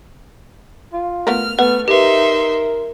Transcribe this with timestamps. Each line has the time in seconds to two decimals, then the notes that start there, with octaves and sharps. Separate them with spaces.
0.93 F4
1.27 A3 B3 A#4 F6
1.59 A3 B3 B4 F#5 F6
1.88 D#4 G4 A#4 B4 E5 C6